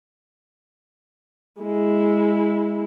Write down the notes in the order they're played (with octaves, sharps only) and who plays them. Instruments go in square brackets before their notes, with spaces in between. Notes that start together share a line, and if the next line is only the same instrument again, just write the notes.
[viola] G#3 E4